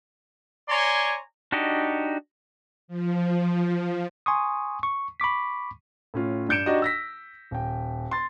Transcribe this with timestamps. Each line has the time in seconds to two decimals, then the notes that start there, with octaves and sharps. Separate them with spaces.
0.68 C#5 D5 G#5 A#5 C6
1.52 D4 D#4 F#4 G4 D#5
2.88 F3
4.26 G#5 C6 C#6 D#6
4.83 C#6
5.20 B5 C#6 D6 B6
6.14 A2 C#4 F4
6.49 G2 D4 G6 C#7 D7 E7
6.66 D4 D#4 F#4 G4 D5 D#5
6.82 E6 A#6 B6
7.51 D#1 G5
8.11 C6 A6